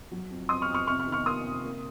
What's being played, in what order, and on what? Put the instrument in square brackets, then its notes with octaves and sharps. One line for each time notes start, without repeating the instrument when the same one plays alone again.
[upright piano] F#3
F2
F2 C6 D#6
C#6 F6
F2
C#6 F6
C3 C#6 F6
C#6 F6
D#3
C#6 F6
A#3 C6 D#6
C3
A#3